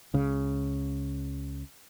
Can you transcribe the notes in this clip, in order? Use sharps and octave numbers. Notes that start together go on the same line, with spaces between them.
C#2 C#3